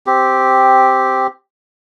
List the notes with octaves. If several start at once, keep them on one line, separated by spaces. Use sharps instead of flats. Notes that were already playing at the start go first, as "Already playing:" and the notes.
C4 G4